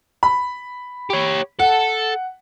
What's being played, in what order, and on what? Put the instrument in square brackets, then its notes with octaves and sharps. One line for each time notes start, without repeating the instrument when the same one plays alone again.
[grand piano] B5
[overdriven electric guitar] G4 C#5
[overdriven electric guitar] A4 [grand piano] F#5